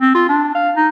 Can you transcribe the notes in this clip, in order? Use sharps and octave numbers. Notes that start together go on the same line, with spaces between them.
C4
F4
D4
F5
D#4